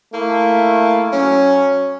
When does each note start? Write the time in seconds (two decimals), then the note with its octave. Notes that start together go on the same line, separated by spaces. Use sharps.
0.12 A3 A#3 E4
1.12 F#3 C#4